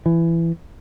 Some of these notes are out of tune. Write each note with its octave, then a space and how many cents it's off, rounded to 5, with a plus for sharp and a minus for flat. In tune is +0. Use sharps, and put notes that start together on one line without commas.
E3 +15